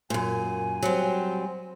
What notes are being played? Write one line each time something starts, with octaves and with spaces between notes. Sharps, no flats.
F#2 A#2 G#5
F#3 G3 C4